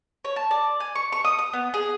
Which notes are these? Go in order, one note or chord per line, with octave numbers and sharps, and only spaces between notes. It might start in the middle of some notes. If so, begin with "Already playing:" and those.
C#5
A5
D5
G#5
C#6
C#6
D#6
D#6
B3
G#4